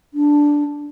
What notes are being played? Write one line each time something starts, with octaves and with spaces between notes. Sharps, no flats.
D4